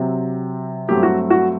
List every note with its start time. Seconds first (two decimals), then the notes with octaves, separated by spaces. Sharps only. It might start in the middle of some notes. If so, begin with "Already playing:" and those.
Already playing: C3 F#3 C4
0.88 G2 F#3 A3 C4 G4
1.03 F#4
1.30 F#4